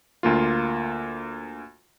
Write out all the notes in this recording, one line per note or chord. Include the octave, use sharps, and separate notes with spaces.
D2 A#3 F4